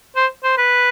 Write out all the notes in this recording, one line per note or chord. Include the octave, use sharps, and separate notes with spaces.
C5
C5
B4